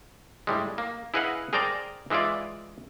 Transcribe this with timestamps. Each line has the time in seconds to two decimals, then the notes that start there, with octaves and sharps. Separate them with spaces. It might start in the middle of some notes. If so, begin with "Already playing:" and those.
0.47 A2 G3 G#3
0.78 A#3
1.14 E4 G#4 B4 D#5 F5 F#5
1.53 G#4 A#4 C5 D5 G5 A#5
2.10 E3 G#3 E4 F4 D5